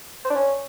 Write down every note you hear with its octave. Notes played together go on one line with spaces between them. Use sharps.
C5
D4
C#4